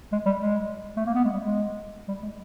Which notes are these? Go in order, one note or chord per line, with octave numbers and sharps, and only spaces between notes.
G#3
G3
G#3
A3
A#3
B3
G#3
G3
G#3
G3
G#3